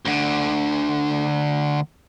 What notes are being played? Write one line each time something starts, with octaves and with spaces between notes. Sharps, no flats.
D2 D3